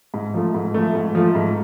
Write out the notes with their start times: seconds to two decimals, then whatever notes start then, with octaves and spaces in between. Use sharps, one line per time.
0.14 G#2
0.34 F3 A3
0.54 G#2
0.74 F3 A3
0.95 G#2
1.15 F3 A3
1.35 G#2